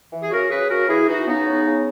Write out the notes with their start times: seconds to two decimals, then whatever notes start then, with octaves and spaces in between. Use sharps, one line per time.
0.11 E3
0.22 G#4
0.31 C#3 F#4 A#4
0.50 C#3 G#4 B4
0.69 C#3 F#4 A#4
0.88 E3 E4 G#4
1.07 E3 D#4 F#4
1.27 C#3 B3 D#4
1.46 C#3
1.65 C#3